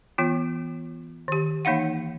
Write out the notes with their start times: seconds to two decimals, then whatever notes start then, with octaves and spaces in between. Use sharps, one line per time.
0.18 E3 B3 F4
1.28 D#3 G4
1.65 E3 A#3 D#4 F5 F#5